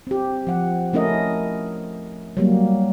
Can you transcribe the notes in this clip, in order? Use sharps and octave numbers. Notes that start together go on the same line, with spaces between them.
C4 G4
F3 F#5
A3 C#4 E4 A#4 D#5
F#3 G3 A#3